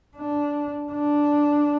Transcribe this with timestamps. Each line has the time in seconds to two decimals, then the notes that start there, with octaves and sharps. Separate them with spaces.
0.17 D4
0.92 D4